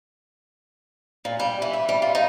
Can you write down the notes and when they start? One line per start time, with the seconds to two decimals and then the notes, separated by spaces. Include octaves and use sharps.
1.25 A#2
1.40 G3
1.62 E3
1.73 E5
1.89 G3
2.02 F4
2.15 D#4